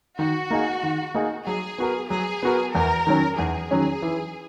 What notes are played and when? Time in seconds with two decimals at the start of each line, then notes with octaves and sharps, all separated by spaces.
0.19 D#3 F#4
0.51 A#3 D#4 G#4
0.83 D#3
1.14 A#3 D#4 G#4
1.47 F#3 G#4
1.78 B3 F#4 A#4
2.10 F#3 G#4
2.43 B3 F#4 A#4
2.74 E2 A#4
3.07 D#3 F#3 C#4
3.39 E2 G#4
3.71 D#3 F#3 C#4
4.02 E3